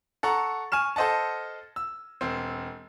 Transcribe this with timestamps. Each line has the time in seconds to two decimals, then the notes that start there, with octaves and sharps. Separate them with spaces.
0.23 A4 F#5 A#5 C#6
0.72 G#5 C#6 F6 E7
0.96 A4 C5 D#5 F#5 A5
1.76 E6
2.21 E1 C4